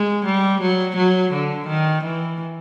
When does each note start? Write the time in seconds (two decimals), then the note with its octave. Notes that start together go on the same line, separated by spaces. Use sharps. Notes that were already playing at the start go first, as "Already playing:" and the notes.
Already playing: G#3
0.25 G3
0.61 F#3
0.96 F#3
1.32 D3
1.67 D#3
2.03 E3